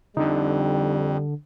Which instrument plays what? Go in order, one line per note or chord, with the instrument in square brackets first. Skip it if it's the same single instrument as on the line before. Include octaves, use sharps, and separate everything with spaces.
[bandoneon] F2 [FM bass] D3 [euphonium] G3 [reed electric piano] D#4